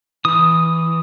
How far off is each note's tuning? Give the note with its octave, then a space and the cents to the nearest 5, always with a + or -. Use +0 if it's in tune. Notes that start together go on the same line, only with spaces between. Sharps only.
E3 +0 D#6 +0